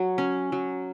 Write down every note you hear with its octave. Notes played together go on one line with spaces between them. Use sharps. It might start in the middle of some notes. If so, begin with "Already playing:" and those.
Already playing: F#3
C#4
F#3